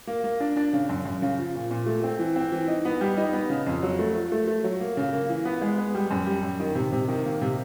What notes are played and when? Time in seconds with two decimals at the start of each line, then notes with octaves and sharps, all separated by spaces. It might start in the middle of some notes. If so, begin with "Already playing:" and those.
0.07 A#3
0.24 A#3
0.40 D4
0.56 D4
0.73 C#3
0.89 F#2
1.05 F#2
1.22 C#3
1.38 F3
1.55 A#2
1.71 A#2
1.86 A3
2.04 C4
2.19 E3
2.36 C4
2.52 E3
2.68 D#4
2.85 B3
3.01 G3
3.18 D#4
3.33 B3
3.50 C#3
3.67 F2
3.82 F#3
3.99 A3
4.15 F3
4.32 A3
4.47 A3
4.64 F#3
4.80 A#3
4.97 C#3
5.13 A#3
5.29 E3
5.45 B3
5.62 G#3
5.78 B3
5.95 G3
6.11 F#2
6.27 G3
6.43 F#2
6.60 D#3
6.75 C3
6.92 C3
7.08 D#3
7.25 A#3
7.41 C3